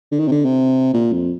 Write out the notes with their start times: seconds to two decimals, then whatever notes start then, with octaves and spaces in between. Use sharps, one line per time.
0.12 D3
0.19 D#3
0.28 C3
0.31 D3
0.45 C3
0.94 A#2
1.12 F2